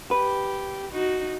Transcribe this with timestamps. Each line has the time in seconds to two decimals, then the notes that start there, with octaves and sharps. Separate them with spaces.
0.11 G4 B4
0.91 D#4 F#4